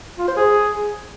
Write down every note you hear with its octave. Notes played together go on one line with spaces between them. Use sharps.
F4
C5
G#4